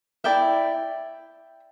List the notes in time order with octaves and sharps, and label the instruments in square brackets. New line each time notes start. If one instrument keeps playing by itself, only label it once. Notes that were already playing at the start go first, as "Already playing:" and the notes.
[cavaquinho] E4 A#4 D5 E5 G5